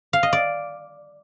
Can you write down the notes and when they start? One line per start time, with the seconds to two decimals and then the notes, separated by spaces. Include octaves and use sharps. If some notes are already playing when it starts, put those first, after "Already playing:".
0.13 F5
0.23 D#5
0.33 D5